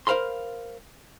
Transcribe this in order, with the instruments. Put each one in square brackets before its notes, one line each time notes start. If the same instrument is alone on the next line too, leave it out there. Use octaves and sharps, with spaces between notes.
[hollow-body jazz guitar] A#4 C5 F5 B5 C6